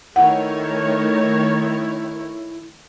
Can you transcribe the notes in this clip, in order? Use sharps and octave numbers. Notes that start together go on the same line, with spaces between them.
D#3 A3 E4 C#5 F#5